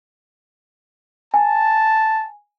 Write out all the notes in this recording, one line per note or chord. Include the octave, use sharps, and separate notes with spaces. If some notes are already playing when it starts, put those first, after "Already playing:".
G#5 A5